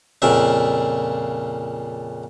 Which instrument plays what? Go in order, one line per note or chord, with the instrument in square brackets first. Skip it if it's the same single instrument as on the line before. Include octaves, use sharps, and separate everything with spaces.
[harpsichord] F2 A#2 C#3 E5